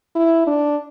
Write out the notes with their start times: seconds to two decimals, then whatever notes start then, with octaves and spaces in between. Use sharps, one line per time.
0.15 E4
0.47 D4